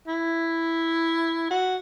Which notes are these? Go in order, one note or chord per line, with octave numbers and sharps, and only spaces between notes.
E4
F#4